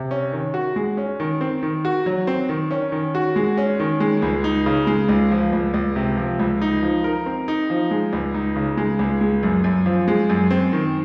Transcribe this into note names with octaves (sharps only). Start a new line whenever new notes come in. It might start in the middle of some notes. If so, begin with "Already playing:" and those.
Already playing: C3
C#4
D#3
F#4
G#3
C#4
D#3
C4
D#3
F#4
F#3
C4
D#3
C#4
D#3
F#4
G#3
C#4
D#3
G#3
C#2
D#4
C#3
G#3
C#2
F3
C#2
C#2
C3
F3
C#2
D#4
F3
A#4
C4
D#4
F3
G#3
C#2
D#4
C#3
G#3
C#2
G#3
F#2
F#2
F3
G#3
F#2
C4
D#3